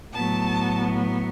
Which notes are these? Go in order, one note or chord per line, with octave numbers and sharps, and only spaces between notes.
A2 F#3 B3 A5